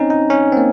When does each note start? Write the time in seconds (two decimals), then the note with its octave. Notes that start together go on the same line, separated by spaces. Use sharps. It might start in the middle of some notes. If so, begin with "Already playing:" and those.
Already playing: C4 C#4 D#4
0.10 D#4
0.30 C#4
0.53 C4
0.57 A#3